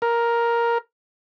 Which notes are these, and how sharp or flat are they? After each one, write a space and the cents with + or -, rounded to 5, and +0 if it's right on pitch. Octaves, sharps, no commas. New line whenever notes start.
A#4 +5